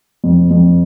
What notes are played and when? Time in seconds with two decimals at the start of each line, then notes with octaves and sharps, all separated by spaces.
0.24 F2
0.51 F2